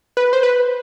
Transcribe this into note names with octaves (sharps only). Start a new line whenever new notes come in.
B4
C5
B4